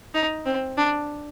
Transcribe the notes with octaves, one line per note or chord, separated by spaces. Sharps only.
D#4
C4
D4